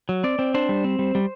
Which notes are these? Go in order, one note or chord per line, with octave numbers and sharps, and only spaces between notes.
F#3
C4 D5
C4
D4 C5
G3
C4
G3
G3